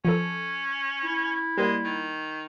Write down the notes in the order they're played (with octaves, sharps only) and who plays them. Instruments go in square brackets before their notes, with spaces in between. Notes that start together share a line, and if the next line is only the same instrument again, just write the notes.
[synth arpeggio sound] F3 A4 [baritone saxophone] C#4
[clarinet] E4
[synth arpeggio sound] G3 A#3 [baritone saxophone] G#3
[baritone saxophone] D#3